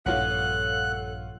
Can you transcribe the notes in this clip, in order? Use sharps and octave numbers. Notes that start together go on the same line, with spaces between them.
A#1 G2 F4 A4 C#5 F#5 F#6